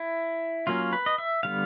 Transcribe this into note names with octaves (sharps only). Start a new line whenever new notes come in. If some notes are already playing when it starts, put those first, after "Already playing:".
Already playing: E4
F#3 A#3 C#4 F4
B4
D#5
E5
D3 G3 B3 F5